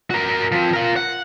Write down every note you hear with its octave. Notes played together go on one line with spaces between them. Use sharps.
F#4 A#4
F3 C4
F4 A#4
F#5